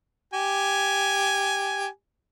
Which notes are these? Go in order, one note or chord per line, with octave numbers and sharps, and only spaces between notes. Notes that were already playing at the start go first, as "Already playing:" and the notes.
G4 G#5